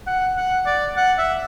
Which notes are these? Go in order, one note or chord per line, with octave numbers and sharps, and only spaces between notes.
F#5
F#5
D5
F#5
E5